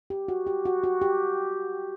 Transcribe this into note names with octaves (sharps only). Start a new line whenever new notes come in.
G4
F#4
G4
F#4
F#4
G4